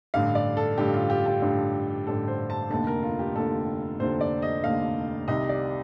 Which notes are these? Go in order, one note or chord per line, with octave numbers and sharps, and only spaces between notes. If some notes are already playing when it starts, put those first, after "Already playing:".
A1 G2 D3 F5
D5
A4
A1 G2 D3 G4
F4
G4
G4
A1 G2 D3
A1 G2 D3 A4
C5
A5
F1 D#2 D3 A5
A#4
F4
G4
F1 D#2 D3 A4
F1 D#2 D3 C5
D5
D#5
F1 D#2 D3 F5
C2 C3 D#3 D#5
D5